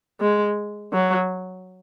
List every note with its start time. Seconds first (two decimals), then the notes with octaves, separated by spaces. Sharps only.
0.20 G#3
0.93 F#3